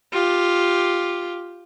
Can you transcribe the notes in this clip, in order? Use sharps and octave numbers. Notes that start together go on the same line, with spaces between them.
F4 G4